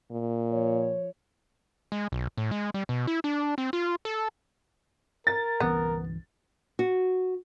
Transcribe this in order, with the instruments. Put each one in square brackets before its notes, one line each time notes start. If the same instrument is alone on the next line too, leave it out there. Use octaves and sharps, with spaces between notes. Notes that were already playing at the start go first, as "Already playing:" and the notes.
[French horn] A#2
[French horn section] F3 C#5
[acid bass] G#3
B1
A2
G#3
G3
B2
E4
D4
C4
F4
A4
[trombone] A#4 [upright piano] A6
[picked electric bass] G1 C2 E3 [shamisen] B3
[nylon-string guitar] F#4